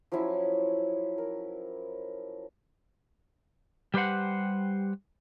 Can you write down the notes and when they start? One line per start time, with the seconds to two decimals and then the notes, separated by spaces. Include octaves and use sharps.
0.12 F3 F#3 C#4 E4
1.18 A#4
3.94 G3 G4 B4 C5 F#5